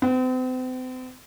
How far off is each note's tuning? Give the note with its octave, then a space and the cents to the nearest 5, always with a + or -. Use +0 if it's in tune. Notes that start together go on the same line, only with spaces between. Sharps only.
C4 -40